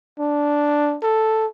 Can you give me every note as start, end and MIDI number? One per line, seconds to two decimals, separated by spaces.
0.19 0.97 62
1.03 1.46 69